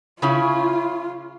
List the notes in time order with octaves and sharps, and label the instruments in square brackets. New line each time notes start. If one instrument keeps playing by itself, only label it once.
[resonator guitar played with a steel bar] C#3 C#4 E4 [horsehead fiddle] F4